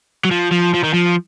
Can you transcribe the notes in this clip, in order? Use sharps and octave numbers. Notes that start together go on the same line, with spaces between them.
F#3
F3
F3
F3
D#3
F3